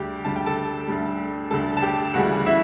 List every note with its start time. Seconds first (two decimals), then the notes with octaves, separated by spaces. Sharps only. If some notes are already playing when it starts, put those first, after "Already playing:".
Already playing: D2 D3 G3 G4 G5
0.25 D2 D3 G3 A5
0.36 G5
0.46 A4 A5
0.88 D2 D3 G3
1.51 D2 D3 G3 A4 A5
1.77 A5
1.82 G4 G5
2.14 D2 C#3 E3 G3 F#4 F#5
2.46 E4 E5